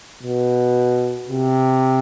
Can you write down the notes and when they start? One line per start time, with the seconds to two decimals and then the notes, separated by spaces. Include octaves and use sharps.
0.23 B2
1.29 C3